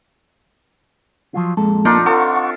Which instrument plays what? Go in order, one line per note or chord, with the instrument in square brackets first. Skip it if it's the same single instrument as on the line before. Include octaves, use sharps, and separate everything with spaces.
[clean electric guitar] F3 F#3 F4
[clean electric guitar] F2 A#2 A4 [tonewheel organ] G#3
[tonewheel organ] A#3 [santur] D4 D#4 F4
[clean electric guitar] C4 F4 [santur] A4 [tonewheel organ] F#5 C#6